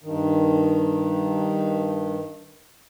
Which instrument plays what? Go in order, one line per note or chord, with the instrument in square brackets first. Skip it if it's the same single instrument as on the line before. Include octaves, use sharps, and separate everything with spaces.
[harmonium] G2 D#3